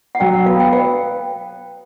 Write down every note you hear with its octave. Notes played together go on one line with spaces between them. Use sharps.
F#5
F#3 G5
F#5
B3 F5
G5
B4 G5